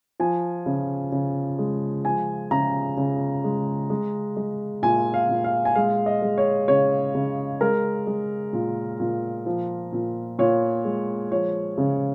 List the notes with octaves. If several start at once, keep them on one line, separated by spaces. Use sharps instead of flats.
F3 G#5
C#3
C#3
G#3
F3 G#5
C#3 A#5
C#3
G#3
G#3
G#3
A#2 G#5
F5
A#2
F5
G#5
G#3 F5
D#5
G#3
C#5
C#3 C#5
C#3
G#3 A#4
G#3
A#2
A#2
F3
A#2
A#2 C#5
G#3
F3 C#5
C#3